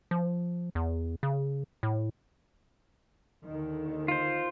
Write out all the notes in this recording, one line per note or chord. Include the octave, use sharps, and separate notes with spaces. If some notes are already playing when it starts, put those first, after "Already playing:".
F3
E2
C#3
A2
D#2 D3 D#3
F4 C5